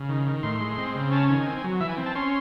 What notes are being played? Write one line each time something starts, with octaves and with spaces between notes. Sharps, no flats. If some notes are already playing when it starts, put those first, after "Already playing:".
Already playing: C#3
D#3
D#3
A2 C6
G#3
C4
C#3
C#4 A5
D#3 G#5
C4
F#3
E3 E5
G#5
C4
A5
C#4 C6